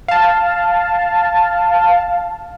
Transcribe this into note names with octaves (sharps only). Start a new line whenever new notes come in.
F5 A5